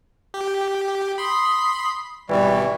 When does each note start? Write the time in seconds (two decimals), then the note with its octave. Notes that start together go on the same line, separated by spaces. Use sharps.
0.34 G4
1.18 B5 C6 D#6
2.29 G#1 B2 E3 G3 C#6